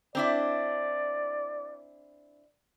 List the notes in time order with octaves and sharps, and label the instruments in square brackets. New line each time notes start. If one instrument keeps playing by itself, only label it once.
[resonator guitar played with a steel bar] C4 D4 E4 [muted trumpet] D5